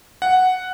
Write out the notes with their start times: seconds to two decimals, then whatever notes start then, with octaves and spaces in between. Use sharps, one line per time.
0.22 F#5